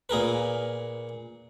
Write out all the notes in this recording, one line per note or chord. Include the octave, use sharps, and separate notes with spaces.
A#2 G#4 A#4 B4